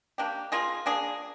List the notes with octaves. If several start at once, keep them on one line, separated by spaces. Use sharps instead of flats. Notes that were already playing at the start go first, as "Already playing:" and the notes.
A#3 D4 G4
A#3 F4 G#4
A#3 D4 G#4